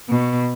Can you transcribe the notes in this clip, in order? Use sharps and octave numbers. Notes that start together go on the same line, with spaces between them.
B2